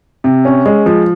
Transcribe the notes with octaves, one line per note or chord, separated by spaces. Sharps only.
C3
C#4
G#3
F3